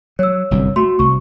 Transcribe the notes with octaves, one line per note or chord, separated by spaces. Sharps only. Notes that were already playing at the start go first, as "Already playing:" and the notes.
F#3 C#5 E6
G1 C2 F#2
A3 F#4 C6
C2 C#6